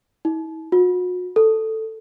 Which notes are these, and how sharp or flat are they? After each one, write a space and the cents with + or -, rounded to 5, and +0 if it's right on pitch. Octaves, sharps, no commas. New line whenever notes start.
E4 -45
F#4 -40
A4 +5